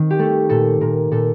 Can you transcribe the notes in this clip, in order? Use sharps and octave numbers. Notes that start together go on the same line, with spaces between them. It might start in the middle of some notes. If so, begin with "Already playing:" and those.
Already playing: D#3 C4
G4
A3 A4
A#2 A4
A#2 A#4
A#2 A4